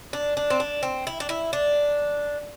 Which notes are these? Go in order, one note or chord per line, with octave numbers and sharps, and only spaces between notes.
D4
D4
C4
D4
C4
E4
D4
E4
D4